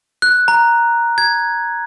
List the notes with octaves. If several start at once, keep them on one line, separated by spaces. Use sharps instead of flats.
F#6
A#5
G#6